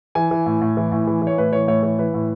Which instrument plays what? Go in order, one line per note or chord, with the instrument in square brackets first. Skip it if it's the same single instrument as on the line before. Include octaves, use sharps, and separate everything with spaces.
[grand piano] E3 G#5
E3
A2
A2
E3
A2
E3
E3
C#5
A2 B4
E3 C#5
A2 C#5
E3 C#5
E3 B4
A2